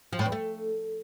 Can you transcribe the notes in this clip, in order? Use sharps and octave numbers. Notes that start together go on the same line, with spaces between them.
F3
A2
E2
A3